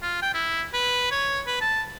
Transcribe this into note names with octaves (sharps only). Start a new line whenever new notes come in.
F4
G5
E4
B4
C#5
B4
A5